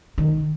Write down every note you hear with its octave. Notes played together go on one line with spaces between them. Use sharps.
D#3